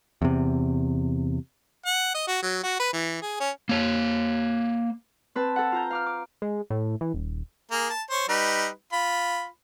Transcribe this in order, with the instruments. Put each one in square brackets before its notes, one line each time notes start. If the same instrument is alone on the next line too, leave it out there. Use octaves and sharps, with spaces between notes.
[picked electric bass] E2 C3
[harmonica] F#5
D#5
F#4
F#3
F#4
B4
E3
G#4
C#4
[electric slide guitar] A#3 C#5
[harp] C4 B4 A5
A4 F#5
F4 A#5 G6
F5 D6 F6
D6
[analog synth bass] G#3
A2
E3
D#1
[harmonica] A#3 G#4
A5
C5 C#5
G3 D#4 B4
F4 B5